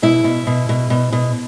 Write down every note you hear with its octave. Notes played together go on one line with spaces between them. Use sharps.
B2 E4 E5
B2
B2
B2
B2
B2